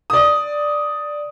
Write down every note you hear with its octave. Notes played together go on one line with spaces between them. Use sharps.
D5 D#6